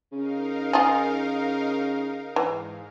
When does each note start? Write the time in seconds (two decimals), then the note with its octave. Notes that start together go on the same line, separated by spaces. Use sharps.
0.12 C#3 D#4 A#4 F5
0.73 F4 G#4
2.36 G#2 E3